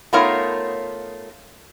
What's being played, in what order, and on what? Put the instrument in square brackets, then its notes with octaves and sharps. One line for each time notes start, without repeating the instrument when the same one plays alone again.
[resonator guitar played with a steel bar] A3 B3 D#4 F4 A#4 C#5